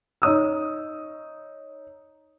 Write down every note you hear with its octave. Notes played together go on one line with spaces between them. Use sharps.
D#4 C#5 D#6 E6